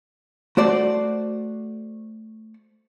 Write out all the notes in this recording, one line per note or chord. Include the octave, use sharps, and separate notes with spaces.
A3 F#4 C5 D5